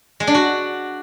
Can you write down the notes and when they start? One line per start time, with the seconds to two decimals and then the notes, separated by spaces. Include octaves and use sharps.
0.20 G#3
0.27 D4
0.35 F#4